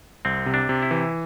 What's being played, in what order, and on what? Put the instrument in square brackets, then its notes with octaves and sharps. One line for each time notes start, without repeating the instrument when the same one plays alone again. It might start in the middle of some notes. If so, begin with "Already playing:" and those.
[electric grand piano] C2 [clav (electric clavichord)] C4
[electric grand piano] C3
[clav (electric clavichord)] D4
[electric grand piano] C3
[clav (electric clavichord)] E4
[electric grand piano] E3